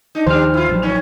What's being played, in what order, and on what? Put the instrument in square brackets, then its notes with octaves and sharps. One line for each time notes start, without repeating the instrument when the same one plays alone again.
[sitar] D4 D#4
[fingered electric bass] D#2 D#3 F3 [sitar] G3 C4 D4 [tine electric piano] C5 F6
[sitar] E4 F4
[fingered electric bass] A1 F3 F#3 [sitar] G2
[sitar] A2 D#3 C#4